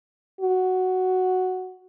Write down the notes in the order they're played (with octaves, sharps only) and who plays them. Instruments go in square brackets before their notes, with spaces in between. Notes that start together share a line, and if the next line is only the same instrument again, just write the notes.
[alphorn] F#4